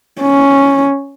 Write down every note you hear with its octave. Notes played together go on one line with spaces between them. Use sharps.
C#4